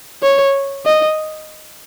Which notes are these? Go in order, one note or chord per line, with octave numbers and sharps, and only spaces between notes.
C#5
D#5